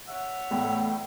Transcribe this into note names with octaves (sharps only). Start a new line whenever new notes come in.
C#5 E5 F#5
E2 A2 A3